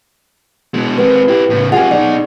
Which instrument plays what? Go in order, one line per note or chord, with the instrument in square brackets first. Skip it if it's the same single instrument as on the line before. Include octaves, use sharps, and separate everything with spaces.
[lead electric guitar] B2 G#3
[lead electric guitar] G#3 C4 [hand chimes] B4
[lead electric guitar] E4 G4
A2 C#3
[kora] G#3 C#4 [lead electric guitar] F4 G4 [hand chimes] F#5
[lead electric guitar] B2 D#4 [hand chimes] D5